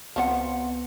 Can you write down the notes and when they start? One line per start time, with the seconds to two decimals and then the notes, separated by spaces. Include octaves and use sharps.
0.16 C#2 F3 B3 C4 F#5 C#7